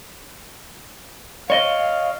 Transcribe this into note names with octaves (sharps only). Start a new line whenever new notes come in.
C#5 D#5 F5